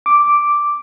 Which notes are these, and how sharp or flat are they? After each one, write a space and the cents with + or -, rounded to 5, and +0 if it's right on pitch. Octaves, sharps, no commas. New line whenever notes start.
D6 +0